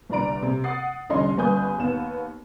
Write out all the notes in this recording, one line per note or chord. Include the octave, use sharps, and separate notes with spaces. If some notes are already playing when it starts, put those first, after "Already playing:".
G1 C2 D4 D5 A#5 D7
C3
F#5 D#6 A6 C7
F1 C2 D3 C#4 D#5 C6
G1 C#3 B4 G#5 D#6 G6
D#2 B3 E7